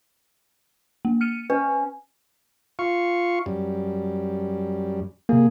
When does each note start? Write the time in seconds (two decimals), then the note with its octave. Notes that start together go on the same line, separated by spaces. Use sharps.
1.05 A#3
1.21 F6 C#7 D#7
1.50 C#4 B4
2.79 F4 F5 C#6
3.46 F#2 G3
5.29 C3 A#3 G#4